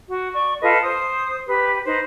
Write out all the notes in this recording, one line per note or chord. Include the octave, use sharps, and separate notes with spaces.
F#4
D5 C#6
F4 A4 B4 D#5
C5 D#6
G4 B4
D#4 B4 C5